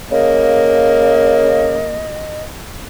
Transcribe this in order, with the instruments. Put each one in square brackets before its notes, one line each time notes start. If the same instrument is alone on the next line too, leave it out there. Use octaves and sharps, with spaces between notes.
[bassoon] C#3 [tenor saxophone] A#3 [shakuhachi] D#5